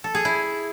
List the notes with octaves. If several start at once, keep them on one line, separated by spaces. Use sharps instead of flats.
A4
G#4
E4